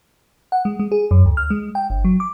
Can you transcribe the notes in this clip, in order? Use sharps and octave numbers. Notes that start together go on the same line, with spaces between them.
F#5
G#3
G#3
G#4
F#2
D2
F6
G#3
G5
G1
F#3
D6